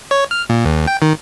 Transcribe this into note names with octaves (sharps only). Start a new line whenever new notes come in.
C#5
F6
A#2
D#2
G5
D#3